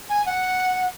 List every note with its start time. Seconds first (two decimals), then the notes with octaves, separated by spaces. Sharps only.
0.09 G#5
0.26 F#5